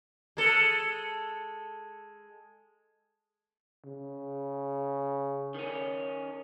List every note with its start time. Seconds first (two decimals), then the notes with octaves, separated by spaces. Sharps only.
0.37 G#3 A4
3.85 C#3
5.54 D#3 C#4